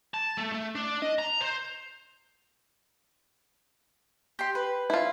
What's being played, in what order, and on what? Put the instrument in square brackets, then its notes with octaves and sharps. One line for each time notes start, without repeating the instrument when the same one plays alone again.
[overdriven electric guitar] A5
A3
A3
D4
D#5
A#5
C5
[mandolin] G4 C6
B4
[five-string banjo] E4 F4